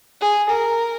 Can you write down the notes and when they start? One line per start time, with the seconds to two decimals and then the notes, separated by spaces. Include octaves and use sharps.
0.21 G#4
0.49 A#4